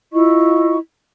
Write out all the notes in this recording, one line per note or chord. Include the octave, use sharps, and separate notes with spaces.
E4 F4 D#5 C#6